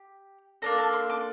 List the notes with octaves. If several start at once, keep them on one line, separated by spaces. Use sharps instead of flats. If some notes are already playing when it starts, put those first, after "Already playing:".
Already playing: G4
A#3 D4 A4 A#5
A5
C6
D6